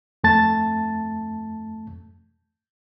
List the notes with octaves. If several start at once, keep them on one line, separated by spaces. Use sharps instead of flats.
F2 A3 A5 A6